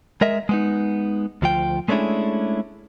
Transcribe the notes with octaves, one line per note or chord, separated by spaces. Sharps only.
G#3 A#4 D#5 E5
G#3 B3 D#4
D2 F3 G5
G#3 A3 C#4 D4 E4 G#4